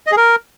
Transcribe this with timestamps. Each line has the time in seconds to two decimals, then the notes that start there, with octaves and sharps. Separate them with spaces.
0.07 D#5
0.12 G#4
0.17 A#4